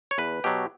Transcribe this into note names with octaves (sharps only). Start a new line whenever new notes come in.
C#5
E2 B4
B2 F#3 G4